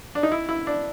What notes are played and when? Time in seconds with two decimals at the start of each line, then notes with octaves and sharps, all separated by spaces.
0.15 D4
0.23 D#4
0.32 E4
0.49 E4
0.67 D4